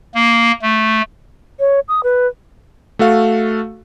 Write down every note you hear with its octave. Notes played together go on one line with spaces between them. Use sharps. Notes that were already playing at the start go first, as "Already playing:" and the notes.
A#3
A3
C#5
D#6
B4
A3 F#4 A4 F5